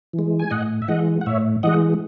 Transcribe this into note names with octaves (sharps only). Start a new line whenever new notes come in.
E3
G#3
G#5
A2 D#5 F#5
E5
E3 G#3 D#5 F#5
F#5
A2 C#5 E5
E3 G#3 D#5 F#5